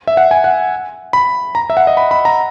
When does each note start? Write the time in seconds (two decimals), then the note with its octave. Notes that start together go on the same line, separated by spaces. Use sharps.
0.07 E5
0.17 F#5
0.31 G#5
0.44 F#5
1.13 B5
1.55 A#5
1.70 E5
1.77 F#5
1.87 D#5
1.97 B5
2.11 B5
2.25 A#5